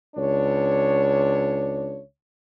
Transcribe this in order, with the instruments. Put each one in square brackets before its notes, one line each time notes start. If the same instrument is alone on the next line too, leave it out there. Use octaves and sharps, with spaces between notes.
[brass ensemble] C#2 D4 C#5